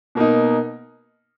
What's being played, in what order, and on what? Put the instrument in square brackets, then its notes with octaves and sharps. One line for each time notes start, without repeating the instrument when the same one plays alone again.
[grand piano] B2 A#3 D#4